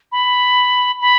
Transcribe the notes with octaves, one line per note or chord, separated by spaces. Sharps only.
B5
B5